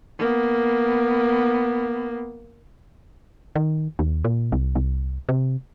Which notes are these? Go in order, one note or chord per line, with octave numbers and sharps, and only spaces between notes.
A#3 B3
D#3
D#2
A#2
C2
C2
C3